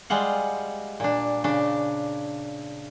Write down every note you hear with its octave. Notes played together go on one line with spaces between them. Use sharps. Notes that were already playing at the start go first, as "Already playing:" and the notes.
G3 G#3 F4 F#5
A#2 D4
C#3 D4